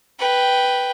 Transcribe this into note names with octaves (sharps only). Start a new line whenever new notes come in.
B4 G5